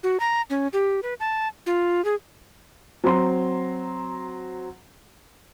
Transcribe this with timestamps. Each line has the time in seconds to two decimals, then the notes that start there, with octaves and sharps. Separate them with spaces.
0.03 F#4
0.20 A#5
0.50 C#4
0.73 G4
1.03 B4
1.20 A5
1.66 F4
2.05 G#4
3.04 F#3 C4 A#5 C6